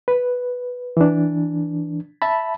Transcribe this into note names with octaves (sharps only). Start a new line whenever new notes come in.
B4
E3 D4
E5 A5 B5